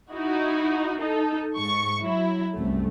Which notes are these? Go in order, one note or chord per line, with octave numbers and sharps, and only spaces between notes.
D#4 E4 F#4
D#4 A4
G#2 C#6
F#3 E4
C2 F#2 A3